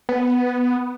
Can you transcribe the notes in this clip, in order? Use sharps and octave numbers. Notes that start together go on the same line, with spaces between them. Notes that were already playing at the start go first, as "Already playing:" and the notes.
B3